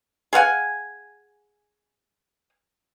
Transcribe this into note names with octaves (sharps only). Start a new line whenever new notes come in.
G#4 F5 F#5 G#5